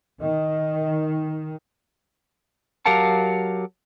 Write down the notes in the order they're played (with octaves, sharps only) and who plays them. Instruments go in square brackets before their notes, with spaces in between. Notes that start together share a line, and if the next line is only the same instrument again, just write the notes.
[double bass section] D#3 [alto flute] D#5
[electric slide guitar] F#3 G4 A#4 F5 F#5 A5